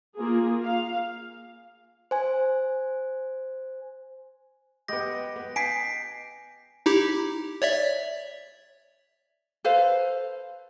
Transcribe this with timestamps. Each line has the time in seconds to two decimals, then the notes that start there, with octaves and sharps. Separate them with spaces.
0.18 A#3 F4 G#4
0.63 F5
2.11 C5 G#5
4.88 G#3 B3 G4 D#5 G5 A#6
5.36 B3
5.56 G#5 B6 C7 D7
6.86 D#4 E4 G4
7.62 C#5 D5 E5
9.64 A4 B4 C5 F5